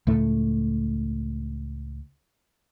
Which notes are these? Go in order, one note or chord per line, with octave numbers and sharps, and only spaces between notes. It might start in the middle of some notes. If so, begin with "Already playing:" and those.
C#2 A2 A3